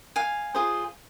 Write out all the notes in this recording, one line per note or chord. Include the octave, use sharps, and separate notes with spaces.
F5 G#5
F4 G#4 C5